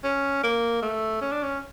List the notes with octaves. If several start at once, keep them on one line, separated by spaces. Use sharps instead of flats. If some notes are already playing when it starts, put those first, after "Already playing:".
C#4
A#3
A3
C#4
D4
C#4